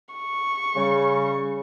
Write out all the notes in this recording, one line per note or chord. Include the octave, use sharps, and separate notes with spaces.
C#6
C#3 G3